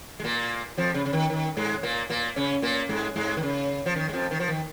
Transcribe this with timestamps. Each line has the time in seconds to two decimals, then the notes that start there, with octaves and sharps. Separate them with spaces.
0.20 G#3
0.24 A#2 A#3
0.77 F2 F3
0.94 C#3
1.05 C#3
1.13 D#3
1.30 D#3
1.57 G#2 G#3
1.83 A#2 A#3
2.10 A#2 A#3
2.36 C#3 C#4
2.62 A#2 A#3
2.89 G#2 G#3
3.16 G#2 G#3
3.37 D#3
3.43 C#3
3.86 F3
3.96 D#3
4.09 G#3
4.13 F2 F3
4.31 D#3
4.40 F3
4.48 D#3